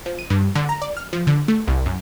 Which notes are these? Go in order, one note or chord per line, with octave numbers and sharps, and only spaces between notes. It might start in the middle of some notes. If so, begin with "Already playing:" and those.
F3
D#7
G2
D3
A#5
D5
F6
F3
D3
A3
C2
F#2